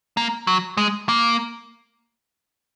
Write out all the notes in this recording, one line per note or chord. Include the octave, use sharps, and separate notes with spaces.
A#3
F#3
G#3
A#3